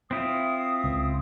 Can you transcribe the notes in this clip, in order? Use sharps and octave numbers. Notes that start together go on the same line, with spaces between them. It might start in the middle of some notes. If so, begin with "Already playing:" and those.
C4 E4 F4 D#6
C#2